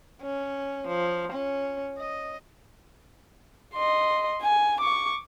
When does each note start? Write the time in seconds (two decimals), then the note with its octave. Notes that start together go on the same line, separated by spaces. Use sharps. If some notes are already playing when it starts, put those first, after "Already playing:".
0.22 C#4
0.88 F3
1.32 C#4
1.98 D#5
3.75 D#5 C6
4.43 G#5
4.81 C#6 D6